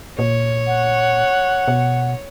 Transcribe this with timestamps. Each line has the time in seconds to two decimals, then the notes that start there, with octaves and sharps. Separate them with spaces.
0.19 A#2 C#5
0.67 F#5
1.68 B2